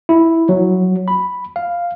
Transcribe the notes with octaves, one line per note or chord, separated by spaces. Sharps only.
E4
F#3
B5
F5